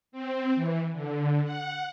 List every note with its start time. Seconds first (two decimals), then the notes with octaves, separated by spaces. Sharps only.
0.12 C4
0.56 E3
0.92 D3
1.44 F#5